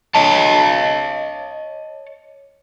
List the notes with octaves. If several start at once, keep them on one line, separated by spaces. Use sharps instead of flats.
C#5 D#5 A5